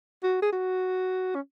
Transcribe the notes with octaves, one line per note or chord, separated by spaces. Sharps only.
F#4
G#4
F#4
C#4